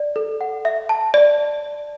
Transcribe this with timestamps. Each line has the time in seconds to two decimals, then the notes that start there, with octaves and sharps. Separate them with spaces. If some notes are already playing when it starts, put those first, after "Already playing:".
Already playing: D5
0.16 A4
0.41 F#5
0.65 E5
0.89 A5
1.14 D5